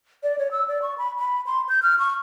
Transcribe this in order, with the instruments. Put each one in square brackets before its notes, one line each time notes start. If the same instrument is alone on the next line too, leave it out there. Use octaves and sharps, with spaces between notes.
[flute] D5
C#5
E6
D5
C#6
B5
B5
C6
G6
F6
C#6